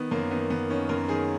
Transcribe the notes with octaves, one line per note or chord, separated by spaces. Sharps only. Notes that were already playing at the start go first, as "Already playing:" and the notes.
Already playing: D#3 B3
F#2 A#3
D#3 B3
F#2 B3
D#3 C#4
F#2 A#4
D#3 G#4